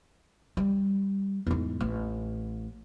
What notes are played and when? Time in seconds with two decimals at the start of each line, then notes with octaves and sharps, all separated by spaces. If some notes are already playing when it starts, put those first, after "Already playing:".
0.57 G3
1.47 E2 G#2
1.81 A1